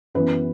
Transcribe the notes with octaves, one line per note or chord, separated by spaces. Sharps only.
F#2 E3 B3 B4